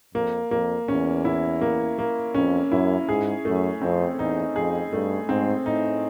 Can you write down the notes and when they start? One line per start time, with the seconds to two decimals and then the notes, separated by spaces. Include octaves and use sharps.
0.14 F2 A#3
0.51 F2 A#3
0.88 E2 C#4
1.25 E4
1.61 A#3
1.99 A#3
2.34 F2 C#4
2.72 F#2 E4
3.08 G#2 G#4
3.45 F#2 A3
3.82 F2 C4
4.18 E2 D#4
4.56 F2 G#4
4.93 G2 A3
5.28 G#2 C4
5.66 A2 D#4